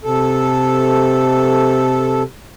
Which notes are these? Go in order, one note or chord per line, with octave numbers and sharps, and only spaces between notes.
C3 A4